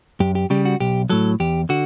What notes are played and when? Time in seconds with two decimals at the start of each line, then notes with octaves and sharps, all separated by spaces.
0.20 F#2 G4
0.35 G4
0.50 C#3 G3 G4
0.65 F#4
0.80 B1 G4
1.10 A2 F#3 A4
1.40 E2 G4
1.69 D3 F#4